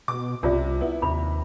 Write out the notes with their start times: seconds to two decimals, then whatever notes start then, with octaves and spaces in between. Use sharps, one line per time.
0.08 B2 D6
0.43 C2 C3 C#4 F4 D5
0.81 B3 E4
1.02 D#2 C3 B5